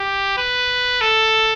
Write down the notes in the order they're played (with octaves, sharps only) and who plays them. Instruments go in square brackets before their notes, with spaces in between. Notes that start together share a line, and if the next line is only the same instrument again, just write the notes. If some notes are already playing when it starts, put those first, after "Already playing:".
Already playing: [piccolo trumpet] G4
B4
A4